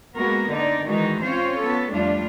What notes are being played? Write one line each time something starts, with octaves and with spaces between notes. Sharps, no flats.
G#3 A#3 B3 F#4 A#4
D3 D#4 D5
D#3 E3 G#3 D#4 F#4
C4 C#4 F4 C5 C#5
B3 A4
F2 G3 A3 D4 F4